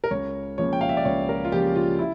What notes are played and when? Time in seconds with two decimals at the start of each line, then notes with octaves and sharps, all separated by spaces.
0.04 A#4
0.11 C#2 C#5
0.58 C#3 F3 A#3 C#5
0.73 G5
0.81 F5
0.89 E5
0.97 D5
1.05 C#2 C#5
1.29 A#4
1.45 F4
1.52 C#3 F3 A#3 G4
1.76 F4
1.99 E4